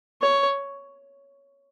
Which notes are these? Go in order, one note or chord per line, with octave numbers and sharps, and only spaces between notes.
C#5